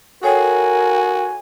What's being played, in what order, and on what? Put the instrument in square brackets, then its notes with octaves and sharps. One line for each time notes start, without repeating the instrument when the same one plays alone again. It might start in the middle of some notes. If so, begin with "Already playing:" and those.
[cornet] F#4 [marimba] A4 C#5 G5 [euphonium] A#4 [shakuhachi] G#5